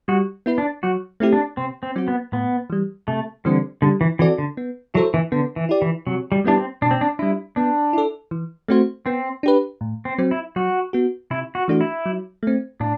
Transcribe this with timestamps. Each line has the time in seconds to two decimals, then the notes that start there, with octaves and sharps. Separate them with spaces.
0.08 G3 F#4
0.46 B3 E4 B4
0.58 D4
0.83 F#3 F#4
1.20 A3 C4 E4 G4
1.33 D4
1.57 C3 C4
1.83 C4
1.96 F#3 C4 F#4
2.08 B3
2.32 A2 B3
2.70 E3 G3
3.08 C3 A3
3.45 D3 E3 G3 C4
3.82 D3 G3
4.01 E3
4.19 E3 C4 F#4 A4 D5
4.38 D3
4.57 B3
4.94 F#3 E4 A4 C5
5.14 E3
5.32 D3 B3
5.56 E3
5.69 E4 G4 D5
5.82 E3
6.07 C3 F#3
6.32 G3
6.44 G3 B3 D4 E4 G4
6.57 C4
6.82 B2 D4
6.91 C4
7.01 D4
7.19 G3 D4 E4
7.56 B3 D4
7.93 E4 A4
8.31 E3
8.68 A3 C4 F#4 C5
9.06 B3 C4
9.43 D4 G4 B4
9.81 A2
10.05 C4
10.18 F#3 C4
10.31 E4
10.56 F#3 F#4
10.93 B3 F#4
11.31 C3 E4
11.55 F#4
11.68 E3 A3 D4 F#4
11.81 E4
12.06 F#3
12.43 A3 C4
12.80 A2 D4